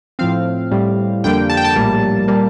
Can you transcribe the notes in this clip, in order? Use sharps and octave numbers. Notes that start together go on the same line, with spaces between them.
A2 F3 C4 F5
A2 G3 C4
F2 D3 G3 A#3 G5
A5
G5
A5
A#1 A2 G3 A#3
A#2 G3 A#3